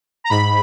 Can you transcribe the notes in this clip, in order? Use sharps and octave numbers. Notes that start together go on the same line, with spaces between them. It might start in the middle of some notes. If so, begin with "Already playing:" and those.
A#5
G#2 B5